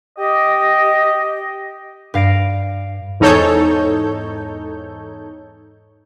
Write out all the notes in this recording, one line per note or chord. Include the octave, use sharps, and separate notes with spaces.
G4 D#5
G2 F5 A#6 D7
E2 G#2 D#4 A4 C#5 G6